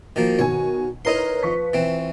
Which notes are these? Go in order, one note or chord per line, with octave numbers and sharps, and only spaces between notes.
D#3 F3 A#3 F#4
B2 D#3 C#5 G#5
D#4 E4 A#4 B4 C#5 D#5 C6
F3 C#6 B6
E3 C4